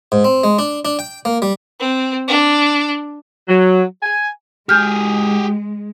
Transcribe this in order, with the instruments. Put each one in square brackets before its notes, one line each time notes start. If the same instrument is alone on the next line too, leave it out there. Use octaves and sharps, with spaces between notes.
[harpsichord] G#2
C4
G#3
D4
D4
G5
A#3
G3
[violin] C4
D4
[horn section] F#3
G#5
[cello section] G#3 [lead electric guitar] G4 G#4 [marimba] F6 G6